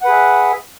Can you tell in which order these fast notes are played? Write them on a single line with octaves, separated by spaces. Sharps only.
F#5 B4 G#4 E5